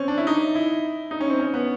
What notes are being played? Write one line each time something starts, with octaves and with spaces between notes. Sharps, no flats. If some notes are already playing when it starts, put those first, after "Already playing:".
Already playing: C4 C#4
D4
E4
D#4
E4
D#4
C#4
C4
C#4
B3